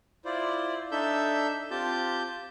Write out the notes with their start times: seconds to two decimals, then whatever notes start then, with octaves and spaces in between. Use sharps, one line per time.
0.25 E4 F4 C5 D5
0.92 D4 D#4 A4 E5 E6 G6
1.71 C4 F4 G4 A5 G6